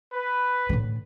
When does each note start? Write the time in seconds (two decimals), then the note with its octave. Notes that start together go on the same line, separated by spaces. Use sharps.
0.13 B4
0.69 A2 D3